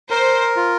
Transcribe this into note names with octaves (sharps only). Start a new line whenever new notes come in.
A#4 C5
F4